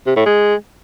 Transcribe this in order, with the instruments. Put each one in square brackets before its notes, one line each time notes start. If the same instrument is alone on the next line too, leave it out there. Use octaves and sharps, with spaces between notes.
[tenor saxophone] C3
A2
G#3